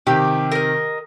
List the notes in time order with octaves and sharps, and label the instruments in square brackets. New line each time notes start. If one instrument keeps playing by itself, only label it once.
[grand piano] C3 D#3 [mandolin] G4
[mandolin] A#4 D#5